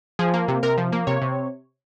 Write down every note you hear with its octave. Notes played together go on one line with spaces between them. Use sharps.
F3 G#4
A#3
C3
C3 A#4
F3
A#3
C3 C#5
C3